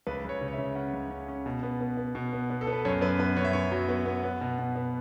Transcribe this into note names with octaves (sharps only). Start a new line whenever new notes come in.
C#2 B4
C#2 C#5
C#3
C#5
E5
C#3
C#4 F#5
C#2
C#4
C#4
B2
B3
B3
B3
B2
B3
B3
A4
B3
B4
F#2 C#5
F#2 B4
B3 B4
F#2 C#5
E5
F#2 C#5
F#3
B3
B3
B3
B2
B2
B3